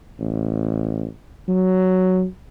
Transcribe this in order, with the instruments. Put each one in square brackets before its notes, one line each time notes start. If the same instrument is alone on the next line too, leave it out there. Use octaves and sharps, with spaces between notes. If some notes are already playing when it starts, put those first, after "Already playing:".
[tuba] A1
F#3